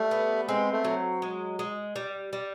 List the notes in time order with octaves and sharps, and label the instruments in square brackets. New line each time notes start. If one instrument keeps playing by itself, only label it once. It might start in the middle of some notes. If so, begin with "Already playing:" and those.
Already playing: [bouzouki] G3 [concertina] A3
[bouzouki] B3
[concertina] G#3 [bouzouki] C4
[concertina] A3
[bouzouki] F#3
G#3
G#3
G3
G3